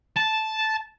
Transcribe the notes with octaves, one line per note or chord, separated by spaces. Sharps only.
A5